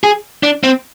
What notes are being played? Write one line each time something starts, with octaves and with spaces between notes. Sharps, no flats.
G#4
D4
C4